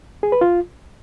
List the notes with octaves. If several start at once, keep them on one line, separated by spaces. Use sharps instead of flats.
G#4
B4
F4